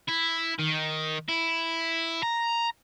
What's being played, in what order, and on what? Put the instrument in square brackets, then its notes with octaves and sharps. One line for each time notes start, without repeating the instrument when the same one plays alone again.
[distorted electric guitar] E4
D#3
E4
A#5